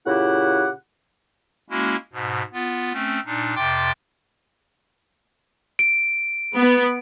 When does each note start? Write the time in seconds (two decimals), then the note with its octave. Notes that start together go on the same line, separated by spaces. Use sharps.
0.06 A#2 C#3 E4 G4 F#5
1.70 G#3 A#3 C#4 E4 F#4
2.13 G#2 B2
2.53 B3 F4
2.93 A3 C4 C#4
3.26 A#2 D4 D#4
3.55 F2 C3 G5 C6 D6 A6
5.79 D7
6.54 B3